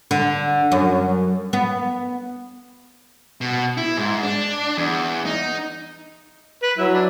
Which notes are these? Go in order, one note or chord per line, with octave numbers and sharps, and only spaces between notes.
D3
F#2
B3
B2
E4
G#2
D4
E2
D#4
B4
F#3 E4
D4